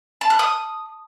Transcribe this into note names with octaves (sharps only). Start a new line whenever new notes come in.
A5
F#6
D#6